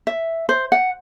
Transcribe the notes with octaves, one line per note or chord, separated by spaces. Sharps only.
E5
C5
F#5